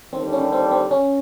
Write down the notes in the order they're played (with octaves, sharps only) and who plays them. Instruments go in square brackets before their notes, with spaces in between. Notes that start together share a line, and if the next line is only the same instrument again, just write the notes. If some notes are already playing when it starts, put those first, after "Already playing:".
[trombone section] D#2 D3 G3 [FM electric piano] C4
[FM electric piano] C#4
C4
C4
C#4